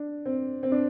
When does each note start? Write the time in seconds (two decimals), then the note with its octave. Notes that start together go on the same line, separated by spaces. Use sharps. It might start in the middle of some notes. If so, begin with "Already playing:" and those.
Already playing: D4
0.25 C4
0.63 C4
0.72 D4